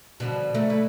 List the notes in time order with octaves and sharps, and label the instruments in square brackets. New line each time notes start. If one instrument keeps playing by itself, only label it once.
[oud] B2 [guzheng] D3 F3 G3
[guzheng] F#3 [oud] A3
[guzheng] E4 B4